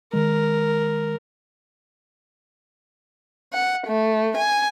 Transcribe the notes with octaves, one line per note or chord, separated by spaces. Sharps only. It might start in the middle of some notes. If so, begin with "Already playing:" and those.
D#3 G#3 A#4
F#5
A3
G#5